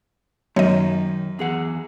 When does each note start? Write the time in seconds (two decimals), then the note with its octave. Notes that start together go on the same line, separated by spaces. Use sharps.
0.56 F#2 D#3 C#5 D#5
1.39 E2 G#4 F#5